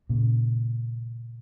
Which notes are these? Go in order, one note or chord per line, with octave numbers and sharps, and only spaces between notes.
A#2 C#3